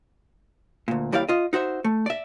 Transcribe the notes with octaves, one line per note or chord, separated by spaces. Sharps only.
D2 A#2
D#2 G3 E4 G4 D5 F5
F4 D#5
D#4 F#4 C5 E5
A3
D5 E5